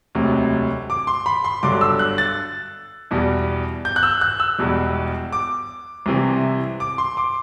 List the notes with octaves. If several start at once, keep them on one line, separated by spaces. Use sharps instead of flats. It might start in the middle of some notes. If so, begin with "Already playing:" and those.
E1 D2 C3 F#3
D6
C6
B5
C6
G1 G2 D3 F#3 D6
E6
F#6
A6
E2 B2 G3
G6
F#6
E6
F#6
E6
E1 E2 B2 G3
D6
C2 C3 E3
D6
C6
D6